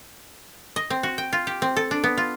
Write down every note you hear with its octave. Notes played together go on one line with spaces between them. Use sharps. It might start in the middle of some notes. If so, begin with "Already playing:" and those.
D#5
C4
F#4
G5
F4
G4
C4
A4
D4
B3
F4